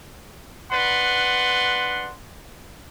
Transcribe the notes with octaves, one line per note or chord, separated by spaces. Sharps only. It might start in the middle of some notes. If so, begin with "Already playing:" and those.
D4 B4 F#5 C6